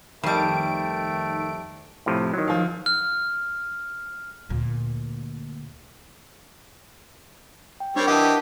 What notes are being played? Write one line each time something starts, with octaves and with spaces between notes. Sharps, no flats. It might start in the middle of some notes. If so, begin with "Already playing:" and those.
F2 D#3 G3 A3 D7
A2 C3 F3
D#3 F#3
F3 F5
F6
D2 A#2
G5
G3 C4 D4 A#4 C#5
E3 G4 D#5 F#5 A5